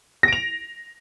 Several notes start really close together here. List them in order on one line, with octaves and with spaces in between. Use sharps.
A#6 D7 F7